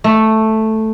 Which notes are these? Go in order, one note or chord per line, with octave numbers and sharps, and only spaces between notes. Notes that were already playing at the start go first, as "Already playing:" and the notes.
A3